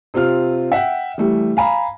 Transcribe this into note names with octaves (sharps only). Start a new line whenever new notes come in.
C3 C4 F4 F6
E5 F#5 G5
E3 G3 A3
F5 G#5 A#5 B5